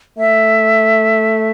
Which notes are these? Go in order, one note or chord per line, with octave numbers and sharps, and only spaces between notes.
A3 E5